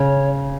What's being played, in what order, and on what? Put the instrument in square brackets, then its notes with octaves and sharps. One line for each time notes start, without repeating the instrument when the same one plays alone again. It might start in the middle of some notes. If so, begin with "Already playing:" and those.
Already playing: [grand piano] C#3 [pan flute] C#5